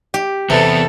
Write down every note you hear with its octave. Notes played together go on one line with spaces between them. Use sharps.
G4
E2 C3 B3 A4